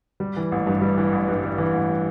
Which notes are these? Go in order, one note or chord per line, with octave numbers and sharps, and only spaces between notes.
G3
E3
A1
G2
G3
E3
A1
G2
G3
E3
A1